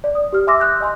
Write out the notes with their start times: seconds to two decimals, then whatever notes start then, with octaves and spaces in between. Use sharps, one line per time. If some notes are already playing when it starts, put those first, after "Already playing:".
0.04 D5
0.15 D#6
0.33 G4 F6
0.47 E5 G#5 C6 D6 E6 A#6
0.60 D#6 F#6 G6
0.80 D#5 G#5 C6